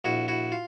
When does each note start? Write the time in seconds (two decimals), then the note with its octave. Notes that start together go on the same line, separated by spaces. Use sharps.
0.04 A#1 E4 F#4
0.28 E4 F#4
0.52 F4